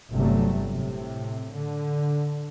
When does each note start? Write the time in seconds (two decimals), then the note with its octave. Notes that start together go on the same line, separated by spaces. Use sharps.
0.12 G1 C3 F#3 G3 A3
0.73 A2 C3
1.54 D3